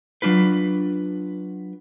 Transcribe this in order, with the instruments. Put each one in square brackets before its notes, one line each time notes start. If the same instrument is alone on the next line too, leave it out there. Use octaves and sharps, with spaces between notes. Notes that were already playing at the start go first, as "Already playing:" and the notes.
[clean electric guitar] F#3 C#4 D4 F4 B4